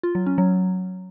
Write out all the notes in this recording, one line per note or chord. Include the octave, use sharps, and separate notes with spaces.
F4
F#3
C#4
F#3